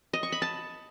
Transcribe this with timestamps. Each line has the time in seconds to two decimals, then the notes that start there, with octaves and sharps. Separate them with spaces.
0.13 D#5
0.23 C#6
0.32 B5
0.42 A5